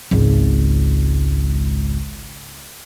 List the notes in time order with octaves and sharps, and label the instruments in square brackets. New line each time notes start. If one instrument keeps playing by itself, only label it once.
[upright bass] G#1 C#2